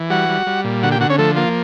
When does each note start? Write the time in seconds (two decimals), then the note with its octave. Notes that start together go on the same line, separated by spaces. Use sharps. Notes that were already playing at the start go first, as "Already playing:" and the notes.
Already playing: E3
0.10 G3 F#4 F#5
0.29 G3
0.47 G3
0.64 A#2
0.83 D3 F#4 F#5
0.92 G4 G5
1.00 D3 F#4 F#5
1.09 C#4 C#5
1.18 F3 A3 A4
1.36 A#3 F4